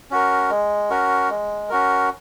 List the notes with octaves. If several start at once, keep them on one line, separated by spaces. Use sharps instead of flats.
C#4 F#4 A#4
G#3
C#4 F#4 A#4
G#3
C#4 F#4 A#4